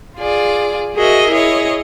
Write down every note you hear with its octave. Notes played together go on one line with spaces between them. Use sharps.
F4 G#4 D5
F#4 G#4 A#4 D#5 E5
E4 G#4 C#5 D#5